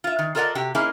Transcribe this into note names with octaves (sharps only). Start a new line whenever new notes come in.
F4 E5
D#3
F4 A4 A#4 D5 D#5 F#5
C3 F#4 G4
A#3 C#4 D#4 E4 G#4